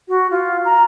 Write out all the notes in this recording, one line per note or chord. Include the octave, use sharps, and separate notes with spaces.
F#4
F4
A#5